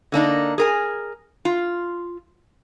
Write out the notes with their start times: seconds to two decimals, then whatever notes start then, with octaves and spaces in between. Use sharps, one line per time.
0.12 D3 A#3 D4 D#4
0.58 G#4 A#4 G#5
1.45 F4